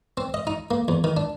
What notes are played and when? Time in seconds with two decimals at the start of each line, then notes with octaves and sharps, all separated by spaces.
0.17 C4
0.34 D#5
0.47 D#4
0.71 A#3
0.88 E2
1.04 D#3
1.17 D4